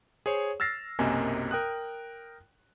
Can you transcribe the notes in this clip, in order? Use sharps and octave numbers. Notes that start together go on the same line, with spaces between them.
G#4 C5 C#5
E6 F6 A6 A#6 C7
B1 F#2 C3 A#3 D#5 G#5
A#4 G5 D#6 F#6